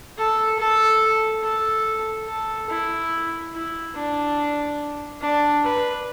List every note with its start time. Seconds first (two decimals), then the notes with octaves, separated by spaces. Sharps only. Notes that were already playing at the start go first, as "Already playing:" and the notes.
0.18 A4
0.59 A4
1.43 A4
2.28 A4
2.69 E4
3.53 E4
3.95 D4
5.21 D4
5.64 B4